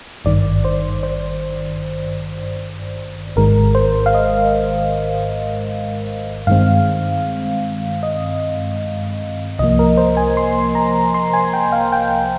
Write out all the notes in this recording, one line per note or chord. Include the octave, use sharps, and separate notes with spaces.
G#1 G2 D#3 D5
C5
C5
G#1 G#2 D#3 G#3 A#4
C5
F5
D#5
G2 D#3 G#3 C4 F5
D#5
C2 C3 F3 A#3 D#5
A#4
C5
G#5
C6
A#5
C6
G#5
G5
F5
G5